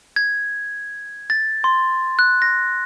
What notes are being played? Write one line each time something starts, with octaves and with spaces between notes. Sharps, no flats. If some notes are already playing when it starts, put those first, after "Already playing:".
G#6
A6
C6
F#6
A#6